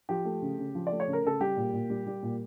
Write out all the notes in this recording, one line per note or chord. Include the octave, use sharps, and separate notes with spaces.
F3 G4
A3
C#3
C#3
F3
D5
A3
C#5
C#3
A#4
C#3 A4
G3 G4
A#2
A#2
G3
G3
A#2